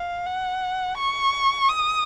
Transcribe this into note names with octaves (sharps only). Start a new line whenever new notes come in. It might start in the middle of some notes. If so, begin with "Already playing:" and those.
Already playing: F5
F#5
C#6
D#6